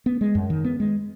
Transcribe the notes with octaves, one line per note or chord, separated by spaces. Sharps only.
B3
G#3
F#2
D#3
B3
G#3